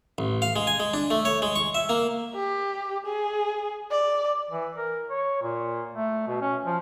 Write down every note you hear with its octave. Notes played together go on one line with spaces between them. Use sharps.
A1
F5
G#3
G#5
G#3
D4
A3
C#5
G#3
C#6
E5
A#3
G4
G#4
D5
E3
A#4
C#5
A#2
A3
B2
C#4
F3